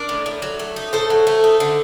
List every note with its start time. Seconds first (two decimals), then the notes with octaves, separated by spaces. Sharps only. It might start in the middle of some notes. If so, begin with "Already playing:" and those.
Already playing: D4 A#4 D5
0.09 A2
0.26 A2
0.42 F#3
0.59 A3
0.76 D#4
0.93 A2 A4 C5
1.10 F#3
1.27 A3
1.44 D#4
1.60 D3